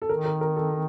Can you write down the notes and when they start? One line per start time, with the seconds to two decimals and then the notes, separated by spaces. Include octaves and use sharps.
0.02 A4
0.09 D#3 A#4
0.25 A#4
0.41 A#4
0.56 A4